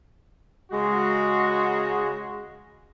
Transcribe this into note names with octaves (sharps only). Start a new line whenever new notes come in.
C#3 G#3 F#4